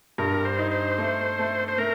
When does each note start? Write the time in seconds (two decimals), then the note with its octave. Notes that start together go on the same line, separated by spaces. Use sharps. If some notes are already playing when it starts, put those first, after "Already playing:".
0.18 G2 A#4
0.45 C5
0.59 D#4
0.71 C5
0.98 A3
1.39 A3
1.68 C5
1.78 A3 A#4